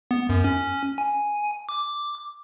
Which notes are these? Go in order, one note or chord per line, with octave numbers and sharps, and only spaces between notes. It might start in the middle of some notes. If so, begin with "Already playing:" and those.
B3
F#2
C#4
G#5
D6